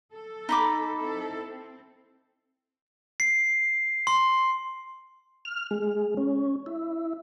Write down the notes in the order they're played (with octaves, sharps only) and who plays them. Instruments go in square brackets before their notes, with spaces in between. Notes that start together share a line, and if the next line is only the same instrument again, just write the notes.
[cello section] A4
[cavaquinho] D#4 B5 D6
[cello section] C4 E4 A4
C4
[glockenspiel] C7
C6
[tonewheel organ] F6
G#3
C#4
E4